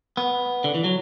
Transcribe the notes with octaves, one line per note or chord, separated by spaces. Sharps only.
B3
D3
E3
F#3